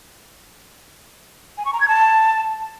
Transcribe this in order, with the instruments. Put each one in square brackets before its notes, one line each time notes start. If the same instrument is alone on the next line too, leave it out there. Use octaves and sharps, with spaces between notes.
[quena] G#5
C#6
A#5
G#6
A5